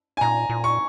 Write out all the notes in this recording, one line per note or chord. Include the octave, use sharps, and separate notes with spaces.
G#5
A#2 A#5
A#2
C#6